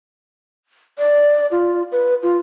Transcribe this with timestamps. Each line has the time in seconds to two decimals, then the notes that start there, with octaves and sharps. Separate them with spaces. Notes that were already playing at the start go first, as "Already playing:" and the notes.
0.98 D5
1.51 F4
1.92 B4
2.23 F4